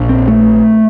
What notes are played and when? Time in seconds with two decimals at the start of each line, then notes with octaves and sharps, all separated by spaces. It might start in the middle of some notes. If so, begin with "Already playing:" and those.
Already playing: A#1 A#2
0.09 C4
0.28 A3